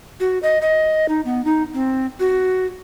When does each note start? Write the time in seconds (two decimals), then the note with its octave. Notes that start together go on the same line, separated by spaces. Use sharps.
0.20 F#4
0.43 D#5
0.62 D#5
1.09 D#4
1.25 B3
1.45 D#4
1.74 C4
2.20 F#4